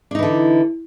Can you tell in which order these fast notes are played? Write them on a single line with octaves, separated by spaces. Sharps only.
D4 D#4 E3 D3